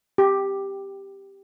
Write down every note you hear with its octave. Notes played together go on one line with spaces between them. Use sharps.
G4